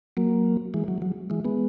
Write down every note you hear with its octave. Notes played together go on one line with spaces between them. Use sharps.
F#3 A#3
E3 G#3
F#3
F#3
E3 G#3
G#3 B3